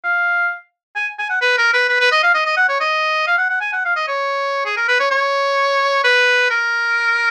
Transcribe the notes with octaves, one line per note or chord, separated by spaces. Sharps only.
F5
G#5
G#5
F#5
B4
A#4
B4
B4
B4
D#5
F5
D#5
D#5
F#5
C#5
D#5
F5
F#5
F#5
G#5
F#5
F5
D#5
C#5
G#4
A#4
B4
C#5
C#5
B4
A#4